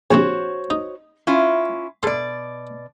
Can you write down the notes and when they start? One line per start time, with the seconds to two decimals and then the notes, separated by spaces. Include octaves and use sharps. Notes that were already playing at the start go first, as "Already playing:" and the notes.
0.11 A#1 C3 F#4 C5 C#5
0.70 D#4
1.27 C#4 E4 F4
2.03 B2 A4 D5 C6